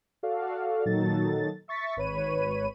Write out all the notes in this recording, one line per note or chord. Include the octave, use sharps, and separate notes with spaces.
F#4 A4 D5 F5
A#2 D#3 F#3 D#4 A4 A6
E5 C#6 A6 B6
G#1 B4 C#5 B5 D#7